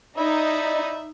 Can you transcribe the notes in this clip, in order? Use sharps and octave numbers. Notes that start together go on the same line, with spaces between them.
D#4 D5 E5 B5